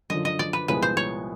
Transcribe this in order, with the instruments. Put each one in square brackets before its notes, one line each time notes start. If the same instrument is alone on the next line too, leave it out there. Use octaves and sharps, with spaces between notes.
[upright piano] F#2 D3 F3 [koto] D#5
[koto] D#5
D5
B4
[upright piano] C2 A#2 F3 G#3 B3 [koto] B4
[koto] C5
C#5